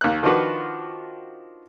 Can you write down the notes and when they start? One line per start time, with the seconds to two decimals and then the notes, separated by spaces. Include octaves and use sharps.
0.01 D#2 F#6
0.23 D#3 F3 D4 F4 F#4 B4